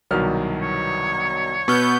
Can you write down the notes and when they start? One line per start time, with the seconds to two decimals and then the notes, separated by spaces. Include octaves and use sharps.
0.11 C2 B2 D#3 F#3 F6
0.61 C#5
1.68 B2 B3 C#6 E6 F6 G6